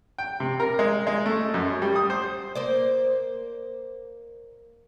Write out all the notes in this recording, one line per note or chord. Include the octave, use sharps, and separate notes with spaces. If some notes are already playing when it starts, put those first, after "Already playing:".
G5
C3
A#4
G#3
G#3
A3
F#2
G3
D#6
C5
A#3 C5 D5